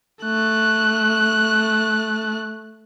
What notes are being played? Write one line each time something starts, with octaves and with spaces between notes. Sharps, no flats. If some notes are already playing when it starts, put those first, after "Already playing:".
A3 F#6